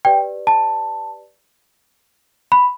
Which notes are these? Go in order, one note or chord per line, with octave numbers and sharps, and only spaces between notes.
G4 B4 D5 G5
A5
B5